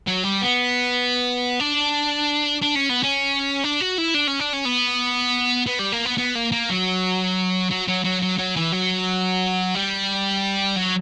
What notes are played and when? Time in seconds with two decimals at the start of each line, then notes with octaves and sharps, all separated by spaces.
0.07 F#3
0.23 G3
0.41 B3
1.60 D4
2.62 D4
2.75 C#4
2.89 B3
3.03 C#4
3.64 D4
3.81 F#4
3.98 E4
4.14 D4
4.27 C#4
4.39 D4
4.53 C#4
4.65 B3
5.67 B3
5.79 G3
5.93 A#3
6.06 B3
6.18 B3
6.35 A#3
6.52 A#3
6.69 F#3
7.71 F#3
7.88 F#3
8.05 F#3
8.22 F#3
8.39 F#3
8.56 E3
8.72 F#3
9.75 G3
10.76 F#3